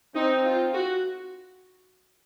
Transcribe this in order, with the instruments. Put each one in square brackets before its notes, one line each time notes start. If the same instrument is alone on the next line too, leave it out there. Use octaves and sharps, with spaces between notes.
[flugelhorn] C4 [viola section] D#4
[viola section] F4
F#4